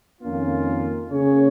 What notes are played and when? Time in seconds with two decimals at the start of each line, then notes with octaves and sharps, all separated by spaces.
0.21 F2 D#3 A#3 C#4 F4
1.09 C#3 A#3 C#4 G#4 C#5